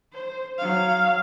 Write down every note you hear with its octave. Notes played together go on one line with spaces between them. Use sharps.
C5
F#3 F5